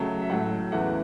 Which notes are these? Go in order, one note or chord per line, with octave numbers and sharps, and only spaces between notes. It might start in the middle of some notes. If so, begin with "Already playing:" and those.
Already playing: C#2 C#3 F#3 A3
E5
A2 F#3 A3 F#5
E2 C#3 E3 A3 F#5